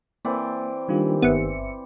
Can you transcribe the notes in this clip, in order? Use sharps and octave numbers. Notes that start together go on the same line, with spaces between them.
E3 A#3 C4 D5
D#3 G3 A#3 D4 F4 G4
G1 B3 E5 C#7